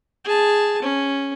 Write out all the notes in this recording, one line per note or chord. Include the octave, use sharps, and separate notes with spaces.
G#4 A5
C#4